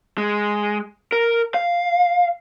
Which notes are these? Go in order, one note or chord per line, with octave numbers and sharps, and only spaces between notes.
G#3
A#4
F5